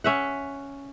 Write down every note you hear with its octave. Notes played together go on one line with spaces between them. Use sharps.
C#4 E5 F#5